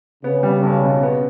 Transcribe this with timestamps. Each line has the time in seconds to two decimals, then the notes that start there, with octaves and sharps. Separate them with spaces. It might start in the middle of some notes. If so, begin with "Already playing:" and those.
0.24 C#3 B3
0.43 G3
0.63 B1
0.83 B2
1.03 B3